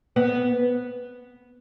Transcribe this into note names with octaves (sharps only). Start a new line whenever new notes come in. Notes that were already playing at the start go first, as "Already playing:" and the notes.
B3